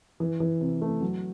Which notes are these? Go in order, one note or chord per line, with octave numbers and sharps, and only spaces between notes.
E3
E3
C3
A3
F#3